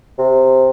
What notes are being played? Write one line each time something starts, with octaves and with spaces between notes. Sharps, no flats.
C3